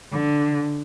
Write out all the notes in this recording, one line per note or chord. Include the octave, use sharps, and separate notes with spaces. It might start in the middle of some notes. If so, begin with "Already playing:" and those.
D3